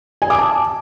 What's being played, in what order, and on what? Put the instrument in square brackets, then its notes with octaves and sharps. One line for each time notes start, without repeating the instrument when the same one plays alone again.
[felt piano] G#5
D6
A5